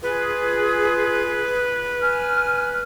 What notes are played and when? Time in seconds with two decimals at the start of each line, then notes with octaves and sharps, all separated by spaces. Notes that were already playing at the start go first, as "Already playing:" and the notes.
0.03 F4 G#4 B4
2.02 G#5 F6